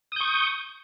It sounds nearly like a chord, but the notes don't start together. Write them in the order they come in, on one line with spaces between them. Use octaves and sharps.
D#6 G6 C#6